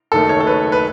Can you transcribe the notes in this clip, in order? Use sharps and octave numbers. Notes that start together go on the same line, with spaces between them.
F#1 F#2 D#3 A3 A4
C#5
A4
B4
B4